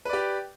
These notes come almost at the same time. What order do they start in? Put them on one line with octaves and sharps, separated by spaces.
B4 D5 G4